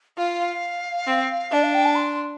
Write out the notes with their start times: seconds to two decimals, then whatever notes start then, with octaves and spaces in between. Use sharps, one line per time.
0.18 F4 F5
1.07 C4
1.51 D4 D5
1.63 F5
1.74 G5
1.85 A5
1.95 C6